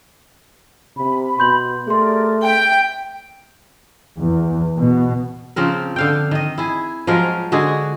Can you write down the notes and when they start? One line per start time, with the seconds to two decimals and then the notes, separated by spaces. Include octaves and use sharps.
0.97 C3 B5
1.39 B2 C6 G6 F#7
1.87 A3 G4 G#4 A#4 D5 C6
2.44 E5 G5
4.18 E2
4.78 B2
5.56 C#3 F3 C4 A#4
5.96 D3 F5 G5
6.31 D#3 D#5
6.58 E4 G#4
7.07 F3 F#3 G#3 A#4
7.52 D3 G#3 F#4 G#4